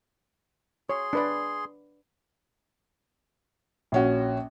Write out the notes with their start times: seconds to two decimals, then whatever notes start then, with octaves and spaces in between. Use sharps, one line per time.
0.90 G#4 C#5 C6
1.13 D4 B4 D5
3.92 A#1 C#4 F#4